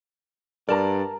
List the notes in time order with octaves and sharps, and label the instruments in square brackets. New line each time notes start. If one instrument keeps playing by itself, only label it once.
[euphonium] G2 [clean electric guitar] A#4 A5 A#5 [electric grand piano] D5